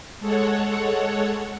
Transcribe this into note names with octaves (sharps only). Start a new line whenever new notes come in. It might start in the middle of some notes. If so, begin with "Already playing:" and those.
G#3 A4 C#5 F#5